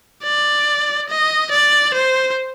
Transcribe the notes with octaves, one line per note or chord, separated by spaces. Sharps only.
D5
D#5
D5
C5